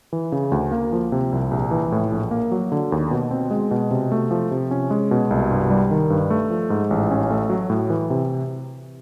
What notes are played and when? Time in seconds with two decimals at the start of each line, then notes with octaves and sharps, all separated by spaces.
0.13 E3
0.32 C#3
0.52 D2
0.71 A#3
0.93 F3
1.12 C3
1.32 C2
1.51 A#1
1.71 E3
1.92 A2
2.12 A#1
2.31 A#3
2.52 F#3
2.72 D3
2.92 D#2
3.11 B2
3.31 C4
3.51 G#3
3.71 B2
3.91 C3
4.12 A3
4.31 F3
4.51 C3
4.71 C#4
4.90 G#3
5.11 B2
5.31 C2
5.51 G2
5.70 G3
5.91 D#3
6.10 G2
6.30 A3
6.51 F3
6.70 G#2
6.90 A1
7.11 C#4
7.31 A3
7.50 F#3
7.70 A2
7.90 E3
8.10 C3